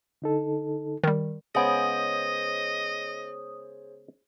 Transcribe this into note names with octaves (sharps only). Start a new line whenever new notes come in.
D3 D#4 A4
D#3 G3
C#3 G#3 B3 G#4 C5 C#5 D#5 D#6